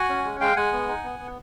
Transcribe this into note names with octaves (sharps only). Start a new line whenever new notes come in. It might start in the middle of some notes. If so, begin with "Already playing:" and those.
Already playing: F#4 F#5 G#5
C#4
G#3
G#3 F5 G5
G#3 F#5 G#5
B3
D#4
B3
B3